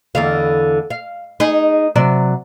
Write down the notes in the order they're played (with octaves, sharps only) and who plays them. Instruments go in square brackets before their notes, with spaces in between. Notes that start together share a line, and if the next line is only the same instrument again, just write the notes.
[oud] E2 D3 F5
F5
D#4 G#4
C3 F#3 D5